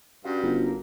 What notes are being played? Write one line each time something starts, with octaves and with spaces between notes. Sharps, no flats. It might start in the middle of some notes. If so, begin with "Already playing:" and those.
G2 C#4 F#4 F5
G1
A#3